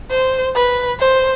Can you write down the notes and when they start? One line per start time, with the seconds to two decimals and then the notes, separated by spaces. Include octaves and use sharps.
0.11 C5
0.55 B4
0.99 C5